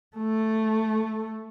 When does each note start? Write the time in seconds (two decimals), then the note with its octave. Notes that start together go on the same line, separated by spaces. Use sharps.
0.16 A3